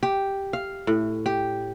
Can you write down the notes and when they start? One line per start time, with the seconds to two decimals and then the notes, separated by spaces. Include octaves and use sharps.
0.03 G4
0.53 F5
0.87 A2
1.26 G4